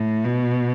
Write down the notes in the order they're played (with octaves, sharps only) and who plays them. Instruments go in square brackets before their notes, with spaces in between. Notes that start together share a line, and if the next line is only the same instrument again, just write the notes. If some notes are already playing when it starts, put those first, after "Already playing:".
Already playing: [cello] A2
B2